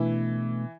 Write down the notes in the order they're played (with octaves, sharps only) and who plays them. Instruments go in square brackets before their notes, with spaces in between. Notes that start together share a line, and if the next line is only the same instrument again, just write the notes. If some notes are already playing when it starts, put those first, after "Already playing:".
Already playing: [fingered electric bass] B2 A3 D4 [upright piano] E3 E4